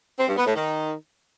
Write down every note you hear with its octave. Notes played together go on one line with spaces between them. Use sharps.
C4
G2
B3
A2
D#3